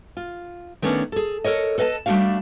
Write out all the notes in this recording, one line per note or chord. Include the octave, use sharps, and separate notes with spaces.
F4
D#3 A3 B3 C#4 D4
G#4 A4
A4 A#4 C#5 D#5
A4 B4 D#5 F5 A5
G3 A3 C4 D4 F#4 F5